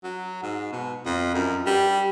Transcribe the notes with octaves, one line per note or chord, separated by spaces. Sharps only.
F#3
G#2
B2
F2
F#2
G3